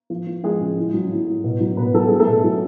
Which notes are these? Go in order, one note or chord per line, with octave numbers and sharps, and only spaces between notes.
F3
F3
F3 G#3 G#4
C#3
A2
F#3
A2
A2
B2
F#3
B2 B3 B4
F#3 A4
F#3 G#4
A3 A4
B2
F#3